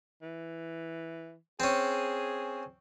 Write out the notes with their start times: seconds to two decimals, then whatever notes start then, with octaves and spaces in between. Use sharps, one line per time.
0.23 E3
1.60 C4 C#4 G#4